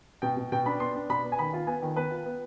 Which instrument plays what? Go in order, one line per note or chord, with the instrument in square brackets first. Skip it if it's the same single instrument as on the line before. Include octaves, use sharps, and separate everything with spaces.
[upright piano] B2 G5
B2
B2 G5
D4 B5
B3 C6
D4
B2 B5
B3
G#5
D#3 B5
F4
B3 G#5
D#3
B3 B4
F4
B3